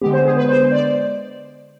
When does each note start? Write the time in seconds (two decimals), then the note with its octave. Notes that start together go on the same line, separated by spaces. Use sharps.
0.01 D3 G#3 B3 G4
0.13 C5
0.25 G#4
0.37 B4
0.49 C5
0.72 D5